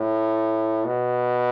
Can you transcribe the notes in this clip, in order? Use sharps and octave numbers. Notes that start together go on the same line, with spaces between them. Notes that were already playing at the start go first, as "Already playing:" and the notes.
Already playing: A2
B2